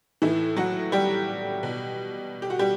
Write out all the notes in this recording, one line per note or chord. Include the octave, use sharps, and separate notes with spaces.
A2 E3 E4
F#3 F#4
G3 G4
B2
G4
F#4
G3 G4